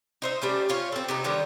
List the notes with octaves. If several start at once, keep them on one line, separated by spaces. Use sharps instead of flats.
D#4 C5 E5
G3 A3 C#4
C#4 F4 C#5
C4 A4
C3 B3 D#4
D3 D#3 G3 B3